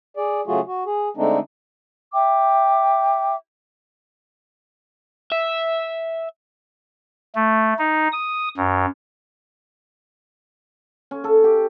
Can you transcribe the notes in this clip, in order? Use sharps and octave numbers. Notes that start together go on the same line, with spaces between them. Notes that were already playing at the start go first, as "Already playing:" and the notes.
G#4 D5
C#3 F#3 A3 F4 F#4 G#4
F#4
G#4
D3 G#3 A3 C4 D4 D#4
E5 G5 D6
E5
A3
D#4
D#6
F#2
C#4
A4
G4